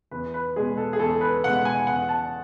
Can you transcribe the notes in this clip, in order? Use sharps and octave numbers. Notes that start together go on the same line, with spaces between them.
E2 B4
B4
B2 G#3 G#4
A4
G#4
E2 A4
B4
B2 G#3 F#5
G#5
E2 F#5
A5